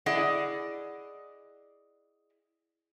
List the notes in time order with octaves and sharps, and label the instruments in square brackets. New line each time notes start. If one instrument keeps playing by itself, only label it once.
[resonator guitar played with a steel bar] E4 G#4 D5 D#5 F#5